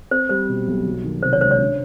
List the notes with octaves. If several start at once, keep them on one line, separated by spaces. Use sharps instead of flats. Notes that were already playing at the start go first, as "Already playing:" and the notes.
C4 C5
G3 C5
B2
B1
F#3
D#3
C3 C5
C#5
C#2 C5
C#5
D4